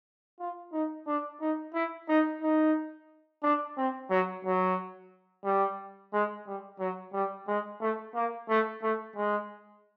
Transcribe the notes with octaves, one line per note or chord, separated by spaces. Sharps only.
F4
D#4
D4
D#4
E4
D#4
D#4
D4
C4
F#3
F#3
G3
G#3
G3
F#3
G3
G#3
A3
A#3
A3
A3
G#3